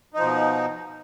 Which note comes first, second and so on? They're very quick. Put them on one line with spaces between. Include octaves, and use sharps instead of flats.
D#4 F3 B2